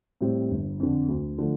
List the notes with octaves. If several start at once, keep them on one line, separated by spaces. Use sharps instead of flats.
A2 G3 C4
G1
F2 D3
D2
D3 F3 A3